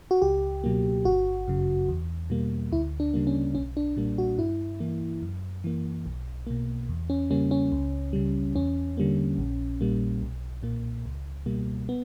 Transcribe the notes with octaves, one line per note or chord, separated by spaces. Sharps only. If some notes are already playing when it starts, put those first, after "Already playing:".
F#4
C#2 G4
B2 F#3 A#3
G1 F#4
F#2 C#3
E2
B2 G3 A#3
D2 E4
D4
C#3 G3 A#3
C#4
B1 C#4
D4
A#2 G3 A#3
F#4
G2 E4
E3 A#3
F#2
E3 A#3
B1
B2 A#3
E2
C#4
C#3 G3 A#3 C#4
C#4
C#2
C#3 G3
E2 C#4
D3 G3 A#3
A#1
A#2 G3 A#3
B1
A#2 A#3
C#2
B2 G3 A#3
B3